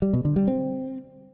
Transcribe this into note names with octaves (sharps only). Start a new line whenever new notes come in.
G3
B2
D3
G3
C4